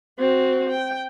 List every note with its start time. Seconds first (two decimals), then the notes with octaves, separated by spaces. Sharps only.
0.19 C4 F#4
0.70 G5